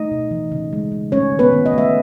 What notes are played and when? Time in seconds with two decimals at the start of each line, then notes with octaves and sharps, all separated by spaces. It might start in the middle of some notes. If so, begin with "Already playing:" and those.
Already playing: A3 D#4 D#5
0.11 B2
0.31 E3
0.52 C#3
0.73 G#3
0.92 C#3
1.12 A3 C#4 C#5
1.32 D#3
1.39 B3 B4
1.53 D#3
1.66 D#5
1.74 A3 E5